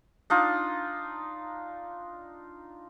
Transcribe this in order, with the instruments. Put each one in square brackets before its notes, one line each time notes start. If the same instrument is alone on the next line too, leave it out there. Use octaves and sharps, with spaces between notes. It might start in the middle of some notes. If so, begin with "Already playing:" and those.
[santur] D4 D#4 F4